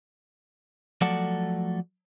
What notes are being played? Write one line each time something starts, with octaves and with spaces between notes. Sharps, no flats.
F3 F#3 A3 A4 D5 F#5